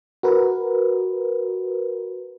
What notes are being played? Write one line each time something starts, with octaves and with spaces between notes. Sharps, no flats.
F#4 A#4 B4